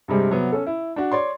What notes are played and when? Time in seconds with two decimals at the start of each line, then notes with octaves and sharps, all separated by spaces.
0.08 G2 C3 G3 G#3
0.30 C3 F#3 B3
0.52 C#4 A4
0.67 E4
0.96 D4 F#4
1.12 C#5 D5 C6